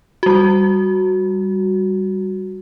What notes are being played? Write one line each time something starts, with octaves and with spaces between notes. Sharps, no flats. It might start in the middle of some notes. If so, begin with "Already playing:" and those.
G3 F#4